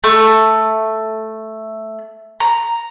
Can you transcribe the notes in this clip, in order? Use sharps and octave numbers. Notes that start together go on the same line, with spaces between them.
A3
A#5